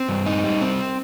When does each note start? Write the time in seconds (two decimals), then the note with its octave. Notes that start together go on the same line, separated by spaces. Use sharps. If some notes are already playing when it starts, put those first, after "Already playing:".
Already playing: C4
0.08 G2
0.26 D#4
0.44 G3
0.61 C4